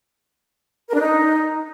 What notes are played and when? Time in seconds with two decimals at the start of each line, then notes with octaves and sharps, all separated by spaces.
0.89 A#4
0.94 D4
1.00 D#4